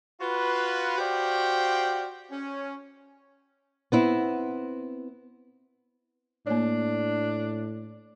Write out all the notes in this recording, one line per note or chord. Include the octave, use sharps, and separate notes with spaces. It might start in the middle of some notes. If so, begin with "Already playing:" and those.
F4 F#4 B4
F#4 G4 C5 D5 F5 G5
C#4
B3 C4 E4
A2 A#3 D4 C#5